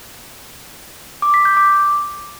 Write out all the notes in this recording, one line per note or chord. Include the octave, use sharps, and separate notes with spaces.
D6
B6
G6
D6